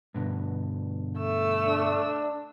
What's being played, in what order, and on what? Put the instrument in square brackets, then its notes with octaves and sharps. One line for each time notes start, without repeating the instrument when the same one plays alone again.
[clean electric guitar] G2 B2 D3
[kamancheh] A3 E6
[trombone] D4